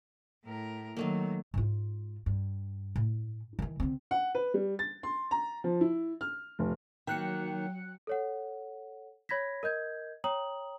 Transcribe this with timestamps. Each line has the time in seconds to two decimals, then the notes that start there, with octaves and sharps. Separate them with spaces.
0.45 A2 A#4
0.97 D#3 F#3 A3 A#3
1.54 G#2 F4
2.26 G2
2.96 A2
3.59 D#3 E3
3.80 D3 C4
4.11 F#5
4.35 B4
4.54 G3
4.79 A6
5.03 C6
5.31 A#5
5.64 F3
5.81 E4
6.21 F6
6.59 F1
7.07 D#3 F#3 A#3 G5 F#6 C#7
8.07 A4 C#5 F#5
9.29 C#5 B5 G#6 A#6 B6
9.63 A#4 D#5 G6 G#6
10.24 C#5 G5 A#5 D#6 F#7